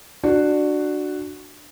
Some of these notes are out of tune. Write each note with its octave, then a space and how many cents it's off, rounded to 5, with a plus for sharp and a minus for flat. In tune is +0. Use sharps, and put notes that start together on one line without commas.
D4 +15 F#4 +0